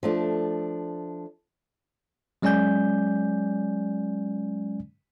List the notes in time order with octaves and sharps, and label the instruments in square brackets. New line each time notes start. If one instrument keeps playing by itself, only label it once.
[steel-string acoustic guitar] F3 A3 D4
[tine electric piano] F#3 G#3 C#4 D5 G#5 G6